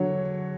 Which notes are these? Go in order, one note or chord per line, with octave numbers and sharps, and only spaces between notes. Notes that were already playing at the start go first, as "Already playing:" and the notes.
Already playing: D3 F#3 C#5